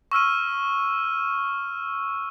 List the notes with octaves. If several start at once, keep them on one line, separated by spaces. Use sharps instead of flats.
C#6 E6 F6 D#7